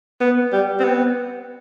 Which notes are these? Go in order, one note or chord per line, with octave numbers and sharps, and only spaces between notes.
B3
G3
C4
B3